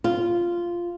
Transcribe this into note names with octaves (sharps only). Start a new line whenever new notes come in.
F4